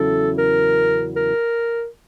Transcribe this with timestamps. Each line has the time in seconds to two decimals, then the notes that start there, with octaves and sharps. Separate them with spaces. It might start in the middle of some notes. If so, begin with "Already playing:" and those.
Already playing: E2 C#3 F#3 E4 A4
0.38 A#4
1.16 A#4